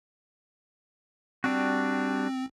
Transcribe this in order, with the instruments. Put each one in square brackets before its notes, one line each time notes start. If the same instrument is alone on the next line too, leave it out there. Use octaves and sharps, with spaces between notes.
[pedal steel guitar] G3 D4 F#4 [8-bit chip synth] C4